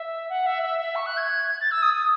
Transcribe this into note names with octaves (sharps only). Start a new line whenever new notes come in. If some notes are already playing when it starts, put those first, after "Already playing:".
Already playing: E5
F#5
E5
E5
E5
C#6
F#6
G#6
A6
E6
D#6
D#6